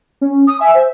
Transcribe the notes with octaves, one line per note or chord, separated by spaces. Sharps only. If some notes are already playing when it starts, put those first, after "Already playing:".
C#4
D#6
E5 G#5
C5